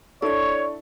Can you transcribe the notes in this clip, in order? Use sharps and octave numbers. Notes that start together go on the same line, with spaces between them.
D4 E4 A4 C#5 D5 C#6